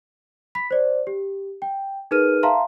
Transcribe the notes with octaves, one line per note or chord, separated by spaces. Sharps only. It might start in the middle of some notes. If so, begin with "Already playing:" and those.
B5 B6
C5 D5
G4
G5
D#4 G#4 A#4 B4 F6 D#7
E5 F5 A5 A#5 C6